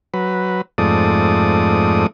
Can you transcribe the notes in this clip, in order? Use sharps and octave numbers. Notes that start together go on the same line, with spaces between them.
F#3 B4
F2 G#2 A3 D5 D#6